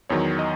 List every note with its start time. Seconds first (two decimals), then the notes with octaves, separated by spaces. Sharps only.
0.09 E2 D#3 F#3 C#5
0.39 D#5